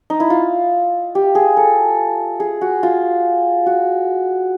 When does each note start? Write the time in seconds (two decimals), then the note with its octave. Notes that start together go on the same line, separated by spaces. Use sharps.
0.10 D#4
0.20 E4
0.30 F4
1.15 G4
1.35 G#4
1.57 A4
2.40 G#4
2.61 F#4
2.83 F4
3.66 F#4